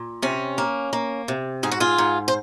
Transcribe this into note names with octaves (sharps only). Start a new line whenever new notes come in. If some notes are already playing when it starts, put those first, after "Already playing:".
Already playing: A#2
C3 C#4
A#3
A#3
C3
G#2 G#4
F#4
F4 G#4
G#2
C5